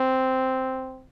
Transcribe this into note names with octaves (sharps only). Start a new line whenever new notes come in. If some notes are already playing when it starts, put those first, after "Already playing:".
Already playing: C4